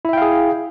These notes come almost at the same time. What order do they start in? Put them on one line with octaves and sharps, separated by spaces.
E4 E5 G5 F5 G#4